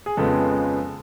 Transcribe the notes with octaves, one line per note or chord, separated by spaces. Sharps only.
G#4
F2 C#3 F3 G#3 B3 A4